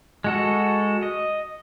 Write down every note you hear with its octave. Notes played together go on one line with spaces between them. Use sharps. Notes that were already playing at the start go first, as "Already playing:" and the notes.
G#3 F#4 A4
D#5